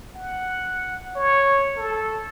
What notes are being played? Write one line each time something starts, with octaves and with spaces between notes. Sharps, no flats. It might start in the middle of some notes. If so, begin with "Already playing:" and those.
F#5
C#5
A4